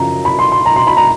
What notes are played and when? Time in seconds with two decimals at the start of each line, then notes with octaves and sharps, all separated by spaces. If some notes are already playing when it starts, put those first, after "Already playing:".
Already playing: F#2 C#3 F3 A#5
0.25 B5
0.39 C6
0.52 C6
0.66 A#5
0.76 C6
0.87 B5
0.97 A#5